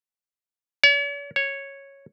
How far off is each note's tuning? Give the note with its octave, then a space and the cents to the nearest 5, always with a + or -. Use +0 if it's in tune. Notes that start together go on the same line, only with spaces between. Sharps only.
C#5 +45
C#5 -5